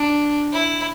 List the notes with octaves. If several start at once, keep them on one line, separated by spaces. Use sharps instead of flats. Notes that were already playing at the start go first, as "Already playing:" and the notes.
Already playing: D4
E4